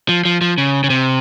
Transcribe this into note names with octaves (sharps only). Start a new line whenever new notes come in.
F3
F3
F3
C#3
C#3
C3